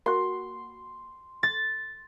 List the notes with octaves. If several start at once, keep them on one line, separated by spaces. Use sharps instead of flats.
A#3 F#4 C6
A6